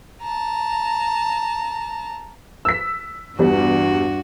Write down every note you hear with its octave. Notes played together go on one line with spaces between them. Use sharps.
A5 A#5
E6 B6
E2 G2 G3 F#4